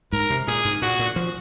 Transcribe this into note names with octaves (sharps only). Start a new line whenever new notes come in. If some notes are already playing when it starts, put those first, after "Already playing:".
G#2 A#4
C3
A#2 G#4
G#2
A#2 F#4
A#2
F3